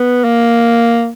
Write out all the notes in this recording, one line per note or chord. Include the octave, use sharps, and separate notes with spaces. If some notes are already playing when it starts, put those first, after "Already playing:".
Already playing: B3
A#3